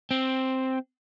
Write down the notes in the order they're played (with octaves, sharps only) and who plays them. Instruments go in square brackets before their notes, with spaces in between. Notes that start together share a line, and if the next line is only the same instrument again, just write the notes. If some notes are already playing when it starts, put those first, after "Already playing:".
[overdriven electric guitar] C4